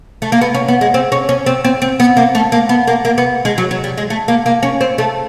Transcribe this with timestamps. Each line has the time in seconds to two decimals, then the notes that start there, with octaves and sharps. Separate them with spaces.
0.22 A3
0.32 A#3
0.41 B3
0.55 C#4
0.68 B3
0.81 G#3
0.94 C4
1.12 C#4
1.29 C#4
1.46 C4
1.65 C4
1.82 C4
2.00 B3
2.17 A#3
2.35 A3
2.52 A#3
2.69 B3
2.87 A#3
3.05 A#3
3.18 B3
3.45 G#3
3.58 F#3
3.71 F#3
3.84 G3
3.97 G#3
4.10 A3
4.28 A#3
4.46 A#3
4.63 C#4
4.81 C4
4.98 A3